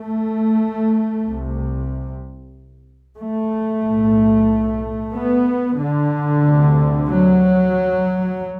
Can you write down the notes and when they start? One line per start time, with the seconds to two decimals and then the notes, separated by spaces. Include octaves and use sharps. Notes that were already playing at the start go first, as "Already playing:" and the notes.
Already playing: A3
1.23 C2 C3
3.18 A3
3.82 B1 A2
5.14 B3
5.78 D3
6.42 D2 C3
7.08 F#3